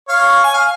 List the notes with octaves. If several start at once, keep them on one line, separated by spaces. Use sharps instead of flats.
C#5 F5
G#5
F5